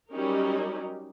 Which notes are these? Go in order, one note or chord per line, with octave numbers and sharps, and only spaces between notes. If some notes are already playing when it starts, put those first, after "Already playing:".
F#3 G3 C#4 D#4 G4 A#4